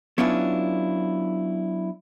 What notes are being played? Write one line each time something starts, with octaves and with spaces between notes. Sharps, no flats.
F#3 B3 C#4 D4 E4 F4